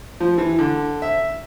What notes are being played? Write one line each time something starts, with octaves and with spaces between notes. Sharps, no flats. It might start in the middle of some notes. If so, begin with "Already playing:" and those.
F3
E3
D3
E5